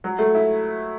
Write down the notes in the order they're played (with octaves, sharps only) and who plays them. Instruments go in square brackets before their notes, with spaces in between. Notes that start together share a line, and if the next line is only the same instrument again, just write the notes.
[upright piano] F#3
A3
E4